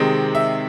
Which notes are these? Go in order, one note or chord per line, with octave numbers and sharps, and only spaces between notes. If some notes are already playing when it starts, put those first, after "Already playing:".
Already playing: C3 D#3 G#3 C4 D#5
E5